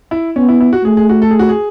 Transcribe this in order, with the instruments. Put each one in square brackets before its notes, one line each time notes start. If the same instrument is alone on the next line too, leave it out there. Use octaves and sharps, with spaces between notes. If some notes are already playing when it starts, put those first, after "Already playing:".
[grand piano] E4
[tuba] B3 [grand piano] C#4
[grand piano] E4
E4
F#4
[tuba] A3 [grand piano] G#4
[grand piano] G#4
F#4
A4
G#4
F#4
G#4